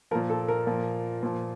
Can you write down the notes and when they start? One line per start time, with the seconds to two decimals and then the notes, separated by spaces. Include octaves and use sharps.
0.11 F3 A#4
0.15 A#2
0.30 A4
0.48 A#4
0.67 A#2 F3
1.23 A#2 F3